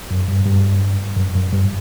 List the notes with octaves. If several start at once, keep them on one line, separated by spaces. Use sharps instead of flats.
F#2
G2
G2
F#2
F#2
G2